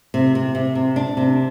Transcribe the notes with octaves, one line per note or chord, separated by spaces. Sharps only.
C3
C3
C3
C3
D4
C3